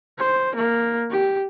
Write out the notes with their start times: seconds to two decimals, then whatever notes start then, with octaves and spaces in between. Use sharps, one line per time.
0.19 C5
0.56 A#3
1.11 G4